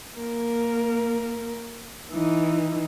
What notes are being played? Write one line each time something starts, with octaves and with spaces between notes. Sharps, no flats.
A#3 A#4
E3 D#4